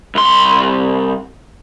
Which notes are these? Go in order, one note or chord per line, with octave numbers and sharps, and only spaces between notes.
C2 C6